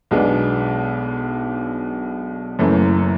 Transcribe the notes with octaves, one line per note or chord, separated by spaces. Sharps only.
B1 B2 G#3 B3 D4
F#1 F#2 E3 A3